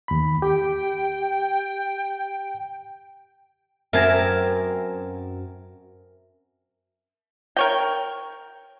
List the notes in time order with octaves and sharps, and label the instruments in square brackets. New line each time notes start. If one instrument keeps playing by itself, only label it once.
[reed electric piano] D#2 B5
[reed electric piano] G4 [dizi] G5
[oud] F#2 C4 [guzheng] A#4 A5 [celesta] E5 G#6 A#6
[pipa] A#4 C#5 G5